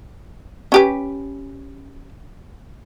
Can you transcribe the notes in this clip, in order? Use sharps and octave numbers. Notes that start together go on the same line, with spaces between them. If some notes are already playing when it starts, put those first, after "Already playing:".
C#4 G4 B4